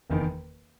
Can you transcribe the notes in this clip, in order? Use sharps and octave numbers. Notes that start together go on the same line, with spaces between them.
F#1 E2 D#3